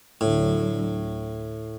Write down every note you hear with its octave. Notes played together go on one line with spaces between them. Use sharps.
D2 A2 D3 F#3